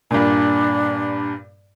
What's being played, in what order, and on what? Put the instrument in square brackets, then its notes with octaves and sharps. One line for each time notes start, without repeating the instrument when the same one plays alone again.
[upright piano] G2 A#2 [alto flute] D4